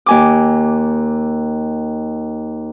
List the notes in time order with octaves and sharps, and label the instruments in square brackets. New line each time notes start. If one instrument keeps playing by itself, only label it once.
[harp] D#2 G#5 D6